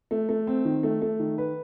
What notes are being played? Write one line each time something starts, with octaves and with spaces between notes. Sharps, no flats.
A3
A3
C4
D#3
A3
A3
D#3
B4